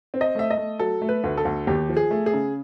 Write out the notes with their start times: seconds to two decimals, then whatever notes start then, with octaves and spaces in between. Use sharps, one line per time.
0.14 C4
0.21 D#5
0.35 A3 E5
0.50 D#5
0.57 A3
0.79 F#3 A4
1.02 A3
1.09 B4
1.24 D2
1.38 A4
1.45 D2
1.67 D#2 G4
1.89 F3
1.97 G#4
2.11 A3
2.26 G#4
2.34 C#3